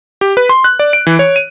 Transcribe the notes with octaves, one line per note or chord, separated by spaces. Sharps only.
G4
B4
C6
F#6
D5
D7
E3
C#5
D#7